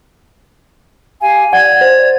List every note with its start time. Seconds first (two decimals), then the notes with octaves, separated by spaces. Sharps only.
1.22 G4 F5 G#5
1.53 D5 F#5 G#6
1.81 C5